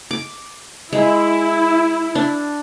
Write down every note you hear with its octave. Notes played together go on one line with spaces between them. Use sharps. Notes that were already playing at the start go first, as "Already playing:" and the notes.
D6
G#3 E4
D4